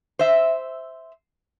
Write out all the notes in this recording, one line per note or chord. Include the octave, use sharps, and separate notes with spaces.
C5 E5